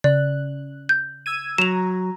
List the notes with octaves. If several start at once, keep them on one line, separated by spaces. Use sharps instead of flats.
C#3 D5 F#6
G6
E6 G#6 D#7
F#3 A#5 E7 F7